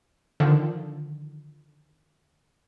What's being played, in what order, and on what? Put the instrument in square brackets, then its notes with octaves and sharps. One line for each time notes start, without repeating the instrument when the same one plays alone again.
[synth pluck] D3 D#3 F3